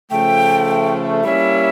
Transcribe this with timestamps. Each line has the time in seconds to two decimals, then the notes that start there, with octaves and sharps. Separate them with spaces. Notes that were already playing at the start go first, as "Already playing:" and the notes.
0.11 C#3 F3 A3 G5
1.24 G3 A#3 C#4 E4 E5